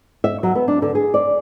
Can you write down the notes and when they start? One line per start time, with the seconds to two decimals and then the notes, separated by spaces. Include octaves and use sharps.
0.24 E5
0.43 F#3
0.55 B3
0.68 D4
0.82 D3
0.95 G#4
1.14 D5